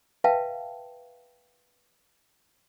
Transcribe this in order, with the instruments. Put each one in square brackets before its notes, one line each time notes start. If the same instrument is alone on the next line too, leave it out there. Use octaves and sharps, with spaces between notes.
[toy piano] B4 E5 F5 G5 A5